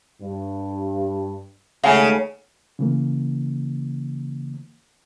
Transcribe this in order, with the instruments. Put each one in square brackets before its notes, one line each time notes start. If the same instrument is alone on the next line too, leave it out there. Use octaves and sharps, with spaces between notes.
[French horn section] G2
[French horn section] D#2 G#3 A3 [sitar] C#3 [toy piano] E5 F#5 G#5
[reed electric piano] C#3 E3 A#3